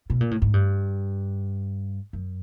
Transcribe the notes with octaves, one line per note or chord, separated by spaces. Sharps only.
B2
A#2
A2
G#2
G2
F#2